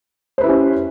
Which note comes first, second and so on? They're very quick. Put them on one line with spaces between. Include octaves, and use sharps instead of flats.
C5 B4 E4 G4 C#4